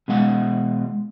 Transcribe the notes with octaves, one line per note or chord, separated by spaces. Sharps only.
B2 G#3 F#5